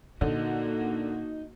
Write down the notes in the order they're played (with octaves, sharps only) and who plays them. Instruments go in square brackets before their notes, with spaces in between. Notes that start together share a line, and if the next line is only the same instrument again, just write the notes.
[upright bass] A#2 [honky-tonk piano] D3 [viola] A#3 F#4 [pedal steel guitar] D#4